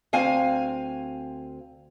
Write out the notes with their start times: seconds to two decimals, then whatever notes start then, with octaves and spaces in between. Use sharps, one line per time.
0.13 D2 C4 F5 G#5